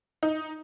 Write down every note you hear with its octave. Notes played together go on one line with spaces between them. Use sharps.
D#4